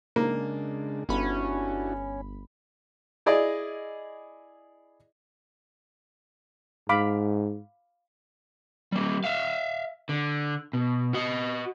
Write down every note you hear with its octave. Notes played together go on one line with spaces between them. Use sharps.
C#3 G#3 A#3 D4
G1 C#4 D4 E4 F#4 B5
E4 G#4 D5 D#5
G#2 F5 B5 D6
G3 A#3
E5 F5
D3
B2
F#4 D#5